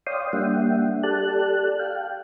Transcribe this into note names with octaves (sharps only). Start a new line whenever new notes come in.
C#5 D5 F5 G5 C6 D#6
G3 A#3 D4 E5 F#5 G5
G4 A4 D5 A5 F#6
F5 G5